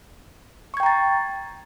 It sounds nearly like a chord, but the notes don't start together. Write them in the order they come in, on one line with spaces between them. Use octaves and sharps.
C#6 G#6 G5 A#5 A6